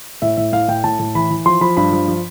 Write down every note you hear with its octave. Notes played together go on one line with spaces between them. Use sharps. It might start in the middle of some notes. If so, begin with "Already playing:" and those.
A2 E5
A2 E5
A2 F5
A2 G5
A2 A5
A2
E3 B5
E3
F3 C6
F3 B5
G2 B5
F3
F3